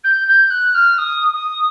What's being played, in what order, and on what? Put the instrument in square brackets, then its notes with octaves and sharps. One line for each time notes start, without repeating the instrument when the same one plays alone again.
[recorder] G6
G6
F#6
F6
D#6
D#6